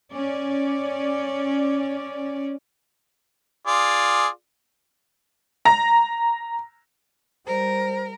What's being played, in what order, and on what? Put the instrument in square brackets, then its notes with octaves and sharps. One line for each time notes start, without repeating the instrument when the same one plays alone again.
[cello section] C#4 D5
[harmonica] F4 G#4 D5
[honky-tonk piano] A#5 A#6
[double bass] G3 [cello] A#4 [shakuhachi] C5